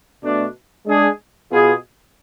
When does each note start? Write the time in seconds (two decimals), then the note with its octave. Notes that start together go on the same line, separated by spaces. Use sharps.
0.22 B2 A3 D4
0.85 G#3 D4 G#4
1.50 B2 B3 F4 G#4